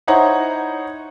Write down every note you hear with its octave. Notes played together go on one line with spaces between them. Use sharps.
D#4 E4 C5 C#5 F#5 A#5